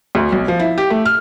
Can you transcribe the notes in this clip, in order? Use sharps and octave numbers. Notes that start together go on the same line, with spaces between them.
D2
B1
F3
E4
G4
A3
F6